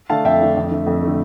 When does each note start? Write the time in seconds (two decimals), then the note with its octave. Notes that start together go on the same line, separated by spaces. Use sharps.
0.09 D3 A3 D4 F5 A5
0.25 F2 E5 G5
0.41 D3 A3 D4
0.57 F2
0.71 D3 A3
0.87 F2
1.02 D3 A3